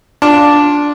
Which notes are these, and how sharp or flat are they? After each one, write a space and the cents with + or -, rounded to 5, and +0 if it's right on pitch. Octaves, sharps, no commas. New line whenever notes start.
D4 -5 F4 +15